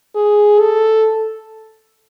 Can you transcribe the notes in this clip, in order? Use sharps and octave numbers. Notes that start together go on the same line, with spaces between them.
G#4
A4